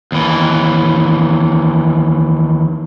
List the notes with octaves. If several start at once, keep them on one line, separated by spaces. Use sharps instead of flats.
D#2 E3